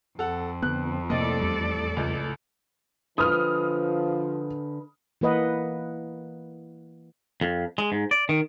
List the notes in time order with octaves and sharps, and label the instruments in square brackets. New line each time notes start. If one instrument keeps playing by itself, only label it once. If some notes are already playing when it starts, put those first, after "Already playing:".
[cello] F2 [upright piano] A4 F#5
[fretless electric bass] D3 B3 [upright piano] F#6
[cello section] A2 A4 D5 [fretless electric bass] C3 A#3 [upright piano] D#5
[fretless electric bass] E2 G3
[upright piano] C#2
[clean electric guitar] D3 B4 [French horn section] F3 [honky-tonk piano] D#6 F6
[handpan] E3 A#3 B4 D#5 F#5
[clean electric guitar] F2
G#3
G#2
D5
D#3